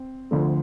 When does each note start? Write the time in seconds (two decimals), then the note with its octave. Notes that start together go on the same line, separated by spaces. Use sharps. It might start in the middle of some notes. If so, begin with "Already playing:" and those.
Already playing: C4
0.31 D2 D3 F3 A3